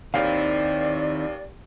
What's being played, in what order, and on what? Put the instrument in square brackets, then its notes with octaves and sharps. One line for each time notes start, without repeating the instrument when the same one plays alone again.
[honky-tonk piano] D#2 F5 [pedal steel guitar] D#3 C4 E4 [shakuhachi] D5